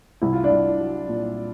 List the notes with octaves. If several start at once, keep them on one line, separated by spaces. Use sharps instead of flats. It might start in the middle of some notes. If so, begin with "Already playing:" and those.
C2 E4
F4
D4 E4
C2
F#3
A#2